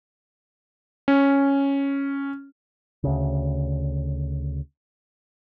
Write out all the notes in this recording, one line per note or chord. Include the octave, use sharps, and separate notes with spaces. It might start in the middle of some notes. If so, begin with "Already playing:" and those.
C#4
D2 C#3